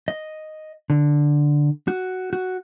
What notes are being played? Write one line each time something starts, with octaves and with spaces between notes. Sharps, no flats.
D#5
D3
F#4
F#4